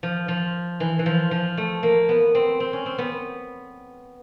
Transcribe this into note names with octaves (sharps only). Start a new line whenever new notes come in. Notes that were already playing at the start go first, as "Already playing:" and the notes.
F3
F3
E3
E3
F3
F3
A3
A#3
B3
C4
C4
C#4
C4
B3